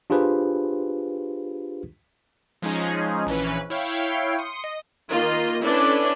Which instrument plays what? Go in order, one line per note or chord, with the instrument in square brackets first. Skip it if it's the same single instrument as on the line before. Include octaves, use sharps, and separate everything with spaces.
[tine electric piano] D4 F4 G4 G#4 B4 C5
[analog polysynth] F3 G#3 C#4 D#4 G#4
A#1 E3 C#4 B4
E4 C#5 F5 G5
C6 D#6 C#7
D#5
[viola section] D#3 A#3 F4 D#5 C6
C#4 D4 E4 A4 B4 D5